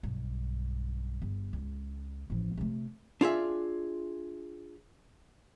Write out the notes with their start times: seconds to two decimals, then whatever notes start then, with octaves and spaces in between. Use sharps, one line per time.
0.03 B1 G2
1.22 G1
1.53 C#2
2.30 A1 F3
2.57 C3 A3
3.21 D4 F4 G#4 E5